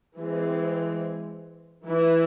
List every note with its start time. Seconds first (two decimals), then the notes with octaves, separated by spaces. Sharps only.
0.19 E3 G#3 C4
1.87 E3 E4